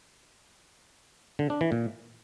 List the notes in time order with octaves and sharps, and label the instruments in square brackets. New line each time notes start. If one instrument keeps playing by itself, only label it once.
[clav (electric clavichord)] D3
D4
E3
A#2